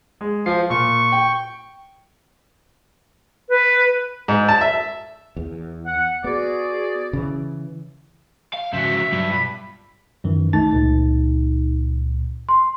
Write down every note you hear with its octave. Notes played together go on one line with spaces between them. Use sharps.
G#3
F3 F4 C7
A#2 C#6
G5
B4
G#2
A5
E5
E2
F#5
B3 F#4 G#4 D5
C#3 E3
F5
G#2 C#3 E3 F3 F#4 E5
E5
G2 F#3
B2 F4 B5
F#2 D#3 E3
B1 A3 D#4 A6
C#2 A#2
C6